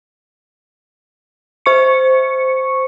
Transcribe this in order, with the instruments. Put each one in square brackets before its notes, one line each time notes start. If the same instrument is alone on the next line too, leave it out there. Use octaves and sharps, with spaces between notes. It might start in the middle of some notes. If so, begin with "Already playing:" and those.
[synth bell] C5 C#6 C#7